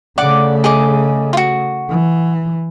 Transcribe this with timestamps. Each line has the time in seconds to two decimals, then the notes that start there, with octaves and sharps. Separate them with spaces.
0.18 C#3 A3 D5 F#5 D6
0.64 G#4 D#5 D6
1.33 F4 F#4
1.90 E3